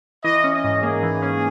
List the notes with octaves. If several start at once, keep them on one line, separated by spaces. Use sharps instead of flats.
E3 D#5
C#4
D#5
G#2
A#3 G#4
E3
C#4